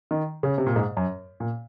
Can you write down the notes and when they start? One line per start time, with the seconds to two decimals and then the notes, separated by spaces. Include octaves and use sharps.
0.11 D#3
0.43 C#3
0.58 C3
0.66 A#2
0.76 G#2
0.97 F#2
1.40 A#2